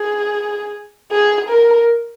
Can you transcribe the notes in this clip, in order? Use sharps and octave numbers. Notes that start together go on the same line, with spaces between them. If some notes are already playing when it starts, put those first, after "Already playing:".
Already playing: G#4
G#4
A#4